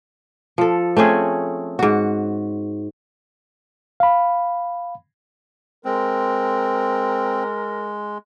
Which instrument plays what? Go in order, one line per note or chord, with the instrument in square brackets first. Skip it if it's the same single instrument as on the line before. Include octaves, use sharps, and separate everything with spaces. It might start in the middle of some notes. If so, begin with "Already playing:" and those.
[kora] F3 A4
A3 C4 C#4 G#4
G#2 F#4
[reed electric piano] F5 B5
[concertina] G#3 [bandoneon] C4 [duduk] A#4